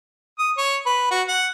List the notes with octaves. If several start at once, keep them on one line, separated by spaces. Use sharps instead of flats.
D#6
C#5
B4
F#4
F#5